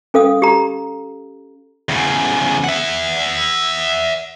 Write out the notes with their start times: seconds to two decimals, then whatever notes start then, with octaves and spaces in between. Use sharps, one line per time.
0.14 C#4 A4 F5 D#6
0.42 G4 A#5
1.89 E2 C#3
2.64 E5 F#5